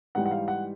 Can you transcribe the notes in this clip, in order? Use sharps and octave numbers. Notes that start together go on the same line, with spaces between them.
G#2 E3 G3 F#5
F#5
F5
F#5